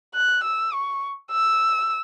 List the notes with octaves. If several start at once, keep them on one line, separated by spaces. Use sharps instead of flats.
F#6
E6
C#6
E6